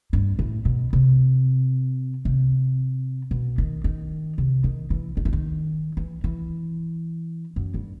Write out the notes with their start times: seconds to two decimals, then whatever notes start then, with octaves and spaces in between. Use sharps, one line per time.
0.13 G2
0.39 A2
0.65 B2
0.93 C3
2.25 C3
3.31 B2
3.58 D#3
3.84 D#3
4.38 C3
4.64 D#3
4.90 E3
5.17 D#3
5.25 E3
5.33 D#3
5.97 E3
6.24 E3
7.56 F#2
7.74 G2